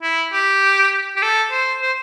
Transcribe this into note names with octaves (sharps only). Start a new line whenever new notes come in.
E4
G4
G4
A4
C5
C5